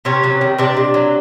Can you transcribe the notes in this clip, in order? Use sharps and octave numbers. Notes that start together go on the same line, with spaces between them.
C3 C#4 C#5
F#3
D#3
C3 D4 D5
C3
F#3